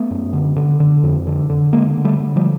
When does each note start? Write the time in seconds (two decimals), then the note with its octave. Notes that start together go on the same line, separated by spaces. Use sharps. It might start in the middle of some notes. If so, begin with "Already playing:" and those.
Already playing: A3 B3
0.11 F#2
0.33 D3
0.56 D3
0.80 D3
1.03 F2
1.27 D3
1.50 D3
1.73 D3 G#3 A#3
1.97 D3
2.05 G3 A3
2.20 D3
2.36 F3 G3